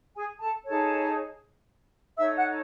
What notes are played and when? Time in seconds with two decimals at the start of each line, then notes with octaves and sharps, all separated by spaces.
0.16 G#4 G#5
0.41 A4 A5
0.66 D#4 G#4 A4 C#5 A5
2.18 D#4 A4 C#5 E5 E6
2.37 F#5 F#6